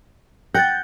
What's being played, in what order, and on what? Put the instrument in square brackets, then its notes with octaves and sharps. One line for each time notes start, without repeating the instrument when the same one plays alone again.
[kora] F#5 [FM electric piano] G5 G6 [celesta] A6 A#6